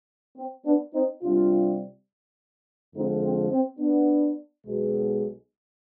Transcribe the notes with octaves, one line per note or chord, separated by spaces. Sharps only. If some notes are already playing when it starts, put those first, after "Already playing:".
C4
B3 D4
C4 D#4
C2 C3 G3 D4 F4
F2 D3 F3 G#3 C4 D#4
C4
C4
B3 D4
B1 B2 G#3